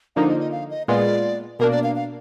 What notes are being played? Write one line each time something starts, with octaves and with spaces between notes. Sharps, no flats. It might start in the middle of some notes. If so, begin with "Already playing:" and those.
D3 F3 A#3 D#4 F5
D#5
D#5
F5
D#5
A#2 G#3 B3 F4 D5
B2 A#3 D4 A#4
D5
F5
F5